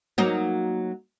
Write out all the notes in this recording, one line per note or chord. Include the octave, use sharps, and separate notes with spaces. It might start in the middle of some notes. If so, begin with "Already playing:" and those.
F#3 A#3 D#4